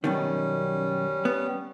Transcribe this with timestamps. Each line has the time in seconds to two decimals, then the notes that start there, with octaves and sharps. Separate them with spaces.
0.04 F#2 B2 D#3 G3 C#4
1.25 B3